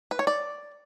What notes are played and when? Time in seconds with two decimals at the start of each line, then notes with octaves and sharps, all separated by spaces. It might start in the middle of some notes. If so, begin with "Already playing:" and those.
0.11 B4
0.19 C#5
0.27 D5